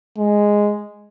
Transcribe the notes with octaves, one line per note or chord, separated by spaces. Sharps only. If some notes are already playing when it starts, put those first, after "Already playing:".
G#3